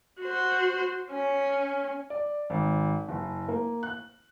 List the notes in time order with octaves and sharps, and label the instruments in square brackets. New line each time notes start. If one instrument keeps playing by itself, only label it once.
[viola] F#4 C5
C#4
[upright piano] D5
G#1
F#1
A#3
F#6